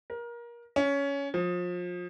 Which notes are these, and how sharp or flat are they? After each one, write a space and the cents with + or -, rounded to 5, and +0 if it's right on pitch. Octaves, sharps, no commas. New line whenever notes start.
A#4 +25
C#4 +15
F3 +30